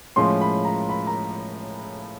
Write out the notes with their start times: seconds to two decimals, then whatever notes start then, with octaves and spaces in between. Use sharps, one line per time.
0.16 A2 F3 G#3 C#4 C6
0.41 B5
0.65 A#5
0.89 B5
1.07 A#5